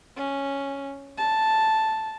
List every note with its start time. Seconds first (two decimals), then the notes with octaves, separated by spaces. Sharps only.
0.17 C#4
1.18 A5